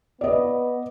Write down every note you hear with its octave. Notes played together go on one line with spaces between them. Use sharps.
B3 D5 D#5